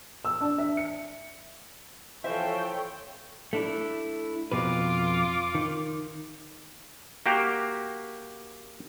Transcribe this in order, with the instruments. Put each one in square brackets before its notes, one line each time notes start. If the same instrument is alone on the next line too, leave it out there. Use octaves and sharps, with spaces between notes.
[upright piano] E6
D4
E5
C#7
[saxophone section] E3 F3 C5 [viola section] A4 C#5 G5 [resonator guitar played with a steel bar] E5
[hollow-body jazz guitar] A3 D4 E4
[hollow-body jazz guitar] F2 B2 B4 [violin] F4 D6
[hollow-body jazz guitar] D#3
[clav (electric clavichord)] A#3 F#4 G4 F5 G5